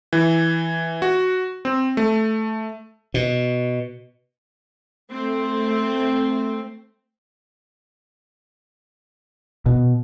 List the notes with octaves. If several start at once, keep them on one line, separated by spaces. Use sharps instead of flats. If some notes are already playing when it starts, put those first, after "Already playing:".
E3
F#4
C4
A3
B2
A3 C4
B2